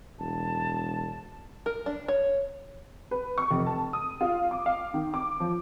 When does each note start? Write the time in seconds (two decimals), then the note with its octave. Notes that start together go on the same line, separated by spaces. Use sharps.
0.19 E1 A5
1.66 A#4
1.86 D4
2.08 C#5
3.11 B4
3.38 C#6
3.51 F1
3.66 A5
3.93 D#6
4.21 F4
4.51 D6
4.66 F5
4.94 D#3
5.14 D6
5.40 F3